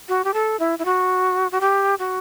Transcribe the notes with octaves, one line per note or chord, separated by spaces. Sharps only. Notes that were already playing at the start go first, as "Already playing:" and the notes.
F#4
G4
A4
E4
E4
F#4
F#4
G4
F#4